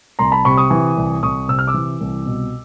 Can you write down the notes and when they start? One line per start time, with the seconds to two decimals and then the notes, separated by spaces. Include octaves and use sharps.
0.19 C2 A#5 C6
0.31 A5 B5
0.45 C3 B5 C#6
0.57 C#6 D#6
0.70 E3
0.97 C2
1.23 C2 C#6 D#6
1.48 C3 E6
1.59 F6
1.67 D6 E6
1.74 E3
2.00 C2
2.26 B2